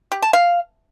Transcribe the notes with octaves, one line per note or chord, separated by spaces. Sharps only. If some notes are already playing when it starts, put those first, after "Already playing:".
G4
A5
F5